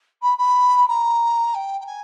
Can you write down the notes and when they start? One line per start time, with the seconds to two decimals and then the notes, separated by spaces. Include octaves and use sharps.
0.22 B5
0.38 B5
0.88 A#5
1.54 G5
1.80 G5
1.86 G#5